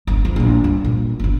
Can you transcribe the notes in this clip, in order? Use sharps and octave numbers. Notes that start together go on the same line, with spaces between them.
G1
F3
A#1 E3
G2
A#2
G1 C#3